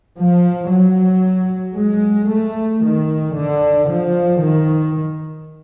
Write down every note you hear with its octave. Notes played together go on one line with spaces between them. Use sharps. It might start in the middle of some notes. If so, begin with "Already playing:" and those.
F3
F#3
G#3
A3
D#3
D3
F3
D#3